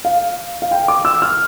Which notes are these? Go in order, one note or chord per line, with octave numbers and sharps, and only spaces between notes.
F5
F5
G5
D6
E6
F6